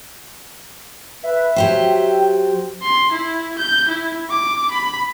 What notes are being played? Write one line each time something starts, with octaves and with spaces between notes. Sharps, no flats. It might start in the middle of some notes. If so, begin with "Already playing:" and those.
B4 E5
F#3 G4 C5 G5
C6
E4
G6
E4
D6
B5